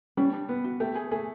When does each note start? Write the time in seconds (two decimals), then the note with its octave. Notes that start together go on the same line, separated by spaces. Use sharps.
0.17 G3 C#4
0.33 D4
0.49 B3
0.64 F#4
0.80 A3 G4
0.95 G#4
1.11 A3 G#4